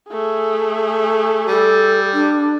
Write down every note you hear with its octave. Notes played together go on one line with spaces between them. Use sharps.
A3 G#4
G3 A4
D4